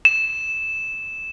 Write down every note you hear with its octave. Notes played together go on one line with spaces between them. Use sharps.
E7